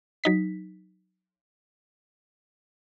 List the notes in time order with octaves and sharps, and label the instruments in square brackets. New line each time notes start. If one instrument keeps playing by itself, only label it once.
[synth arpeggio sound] F#3 D#4 B6